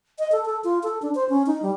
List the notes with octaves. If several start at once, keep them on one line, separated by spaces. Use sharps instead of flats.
D#5
A4
A4
F4
A4
D4
C5
C#4
D#4
G3